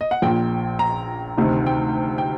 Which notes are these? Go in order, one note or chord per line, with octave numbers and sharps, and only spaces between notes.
D#5
F#5
A#1 A#2 G5
A#5
D2 C3 D#3
G5
G5